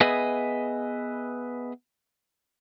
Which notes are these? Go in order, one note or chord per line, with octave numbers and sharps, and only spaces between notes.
B3 G#4 B4 D#5 E5 G#5